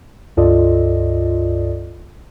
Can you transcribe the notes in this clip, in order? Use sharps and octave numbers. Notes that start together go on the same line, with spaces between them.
C#2 G2 F4 A4 D5 D#5